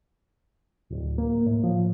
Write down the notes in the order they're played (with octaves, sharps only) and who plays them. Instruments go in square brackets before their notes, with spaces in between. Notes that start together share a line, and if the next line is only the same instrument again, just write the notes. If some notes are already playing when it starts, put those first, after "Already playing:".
[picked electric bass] D1
A#3
A2
F3